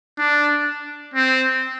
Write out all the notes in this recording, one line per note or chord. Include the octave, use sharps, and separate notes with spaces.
D4
C4